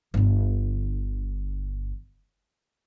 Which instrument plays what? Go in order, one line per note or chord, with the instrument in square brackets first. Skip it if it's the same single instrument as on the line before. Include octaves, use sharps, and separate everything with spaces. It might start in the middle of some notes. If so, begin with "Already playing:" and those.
[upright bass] G1 D3